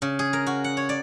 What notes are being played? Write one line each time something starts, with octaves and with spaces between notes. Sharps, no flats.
C#3
G#4
A#4
F#4
F#5
C#5
D5